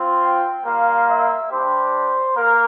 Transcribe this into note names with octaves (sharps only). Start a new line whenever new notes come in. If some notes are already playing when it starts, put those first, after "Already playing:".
Already playing: C4 F4
G5
G3 A#3 F4 F5
E5
G3 D4 G4 C5
A#3 A#4